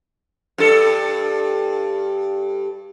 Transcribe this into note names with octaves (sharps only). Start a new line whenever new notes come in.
G2 A4